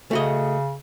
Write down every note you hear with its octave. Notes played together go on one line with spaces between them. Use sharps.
C#3 A3 F#4 D#5